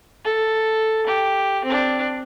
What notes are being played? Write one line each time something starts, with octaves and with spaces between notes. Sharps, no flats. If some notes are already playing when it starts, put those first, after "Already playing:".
A4
G4
C4 D4